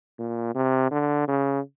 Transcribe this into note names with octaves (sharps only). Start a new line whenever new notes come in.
A#2
C3
D3
C#3